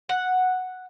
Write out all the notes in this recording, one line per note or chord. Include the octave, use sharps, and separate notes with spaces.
F#5